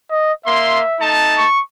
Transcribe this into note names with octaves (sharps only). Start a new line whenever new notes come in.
D#5
A#3 E5 C6
A3 D#4 A5
C#6